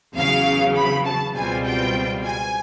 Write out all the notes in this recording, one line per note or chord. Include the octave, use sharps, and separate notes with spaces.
E2 C#3 F#3 F5
B5
A5
C#2 B2 G3 C4 F4 G#5
G5
G#5